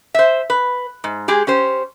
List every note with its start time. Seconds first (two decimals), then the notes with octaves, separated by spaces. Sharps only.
0.14 C5 E5
0.50 B4
1.04 G#2
1.28 G#3 G4 G#4
1.47 C#4 G4 C5